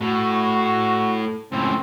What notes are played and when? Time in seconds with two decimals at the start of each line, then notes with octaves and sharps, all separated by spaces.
0.01 A2 F#4
1.52 C#2 A2 C4